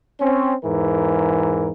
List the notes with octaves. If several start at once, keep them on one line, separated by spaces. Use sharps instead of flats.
C4 C#4
E2 G#2 E3 A#4